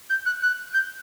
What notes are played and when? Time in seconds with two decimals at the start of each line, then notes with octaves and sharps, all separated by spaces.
0.09 G6
0.25 F#6
0.42 F#6
0.73 G6